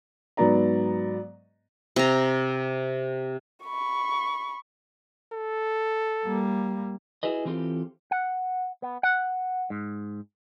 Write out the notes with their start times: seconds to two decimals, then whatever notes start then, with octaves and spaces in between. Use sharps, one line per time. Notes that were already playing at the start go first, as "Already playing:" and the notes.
0.37 G#2 F#3 B3 D5 A#5
1.96 C3 A#5
3.64 B5 C#6
5.33 A4
6.25 G3 A#3
7.23 E4 F#4 G#4 B4 D#5
7.45 E3 F#3 C4 F4 G4 A4
8.11 F#5
8.82 B3
9.03 F#5
9.70 G#2